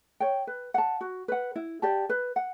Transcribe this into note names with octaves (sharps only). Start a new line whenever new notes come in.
C#5 G5
B4
F#5 A5
F#4
B4 F#5
E4
G4 D5 A5
B4
F#5